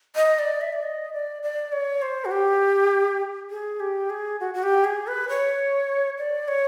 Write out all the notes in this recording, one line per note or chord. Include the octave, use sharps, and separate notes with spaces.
D#5
D5
E5
D5
D#5
D5
D5
C#5
C5
F#4
G4
G#4
G4
G#4
F#4
F#4
G4
G#4
B4
C#5
D5
C#5